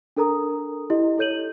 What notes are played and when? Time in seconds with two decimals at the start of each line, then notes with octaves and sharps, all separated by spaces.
0.17 D4 A4 A#4 A#5 D#6
0.90 E4 G4 D#5
1.18 E4 A4 C#5 G6 D#7 F#7